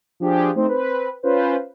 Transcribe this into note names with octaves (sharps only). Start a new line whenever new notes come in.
F3 D4 G4 G#4
A3 C4 D#4 C5
C4 B4
C#4 F4 B4 C5